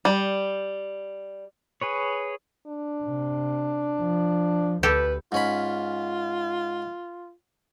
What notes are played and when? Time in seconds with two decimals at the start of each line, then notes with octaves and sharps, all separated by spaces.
0.05 G3
1.81 G#4 B4 C#5
2.66 D4
3.04 C3
4.00 F3
4.83 D2 G4 A4 B4 A5
5.32 G#2 C#4 F4 B5